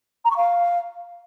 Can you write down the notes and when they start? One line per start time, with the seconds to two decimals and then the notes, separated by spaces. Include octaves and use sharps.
0.25 A#5
0.31 C#6
0.37 F5